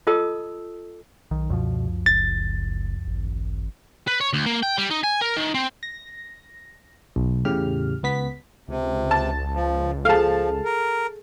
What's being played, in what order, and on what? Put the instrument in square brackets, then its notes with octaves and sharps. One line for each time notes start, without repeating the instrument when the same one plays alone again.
[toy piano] F4 A4 D#5 A5 D#6 E6
[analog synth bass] B1 [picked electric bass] D#3
[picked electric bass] C#2 F#2 F3 [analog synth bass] B2
[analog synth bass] F#1 [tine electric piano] A6
[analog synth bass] G#1
[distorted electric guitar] B4
C#5
D2
A#3
G5
G3
D#4
G#5
A#4
D#3
C4
[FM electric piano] A#6
B1
E2 A2 C#3 G4 F6
C#2 B3 B6
[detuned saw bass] C#2 [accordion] C3
[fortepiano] A5
[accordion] F3
[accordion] F3 [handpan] G#4 A4 [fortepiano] F5 A5
[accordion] A#4